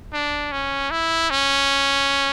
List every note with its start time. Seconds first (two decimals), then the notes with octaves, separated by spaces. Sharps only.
0.13 D4
0.52 C#4
0.91 E4
1.30 C#4